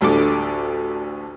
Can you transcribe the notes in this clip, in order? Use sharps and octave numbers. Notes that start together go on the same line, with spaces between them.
A1 D2 D3 A4 D6